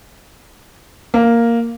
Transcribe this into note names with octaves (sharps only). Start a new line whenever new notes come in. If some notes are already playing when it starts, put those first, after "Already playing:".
A#3